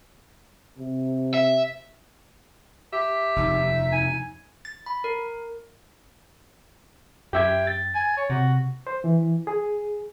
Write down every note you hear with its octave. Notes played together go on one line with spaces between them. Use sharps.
C3
E5
G4 E5
F1 D#2 D#4
G#5
A6
B5
A#4
F#2 G4 E5 G5 G#6
A6
G#5
C#5
C3 F#4
C5
E3
G#4